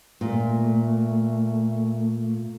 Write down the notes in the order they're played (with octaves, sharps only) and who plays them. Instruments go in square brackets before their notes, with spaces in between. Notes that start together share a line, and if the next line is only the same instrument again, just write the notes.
[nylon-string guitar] A#2 [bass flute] A3